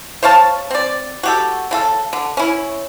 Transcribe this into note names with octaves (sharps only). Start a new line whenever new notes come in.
C5 C#5 F5 A5
C4 D5
F#4 G4 A4
C#3 F4 A4
D3
C#4 E4